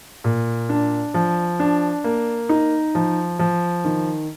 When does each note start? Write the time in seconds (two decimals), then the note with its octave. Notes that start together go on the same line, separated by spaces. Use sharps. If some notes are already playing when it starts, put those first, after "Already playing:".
0.24 A#2
0.69 D4
1.14 F3
1.60 D4
2.04 A#3
2.49 D#4
2.95 F3
3.39 F3
3.85 D#3